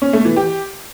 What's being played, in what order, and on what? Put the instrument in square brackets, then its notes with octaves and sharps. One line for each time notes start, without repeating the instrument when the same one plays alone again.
[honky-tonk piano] C#4
A3
E3
G4